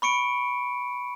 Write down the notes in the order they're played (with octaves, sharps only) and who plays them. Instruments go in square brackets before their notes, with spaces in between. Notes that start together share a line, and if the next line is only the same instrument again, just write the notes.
[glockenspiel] B5 C#6 C#7 D7